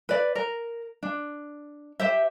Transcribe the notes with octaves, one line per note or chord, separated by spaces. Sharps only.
B4 D5
A#4
D4
G4 C5 E5